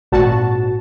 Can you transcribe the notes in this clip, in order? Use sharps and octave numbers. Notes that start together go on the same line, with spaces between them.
G#1 A#2 F#4 A5